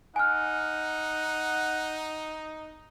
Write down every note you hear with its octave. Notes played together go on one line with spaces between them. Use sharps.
D#4 F#5 G#5 F6